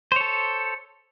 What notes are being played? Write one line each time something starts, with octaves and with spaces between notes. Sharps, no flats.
A4 C5 C#5